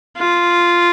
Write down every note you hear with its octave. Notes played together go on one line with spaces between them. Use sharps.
F4